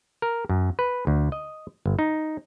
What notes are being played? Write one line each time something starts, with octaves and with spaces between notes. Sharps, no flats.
A#4
F#2
B4
D2
D#5
G1
D#4